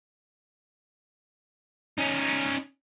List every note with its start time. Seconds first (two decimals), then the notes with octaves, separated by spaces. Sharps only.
1.98 C#4 D#4